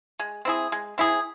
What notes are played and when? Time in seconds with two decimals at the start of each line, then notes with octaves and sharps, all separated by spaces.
0.19 G#3
0.45 C4 E4 G#4
0.72 G#3
0.98 C4 E4 G#4